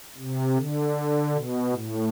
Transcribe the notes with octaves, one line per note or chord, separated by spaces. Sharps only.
C3
D3
B2
A2